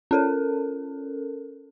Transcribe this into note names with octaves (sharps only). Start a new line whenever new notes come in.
C#4 A4 A#4